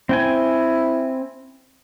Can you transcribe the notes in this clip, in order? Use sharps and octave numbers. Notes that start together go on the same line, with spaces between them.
C4 E4 G5 G#5